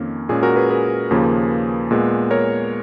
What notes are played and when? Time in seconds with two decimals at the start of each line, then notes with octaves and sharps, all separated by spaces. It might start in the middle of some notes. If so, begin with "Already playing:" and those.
Already playing: F2 D#3 A#3 C#4
0.29 A#2 G#3 C#4 G#4
0.43 F#4 A#4
0.56 G#4 B4
0.70 G#4 B4
1.11 D#2 C#3 F3 A#3
1.91 A#2 G#3 B3
2.31 A#4 C#5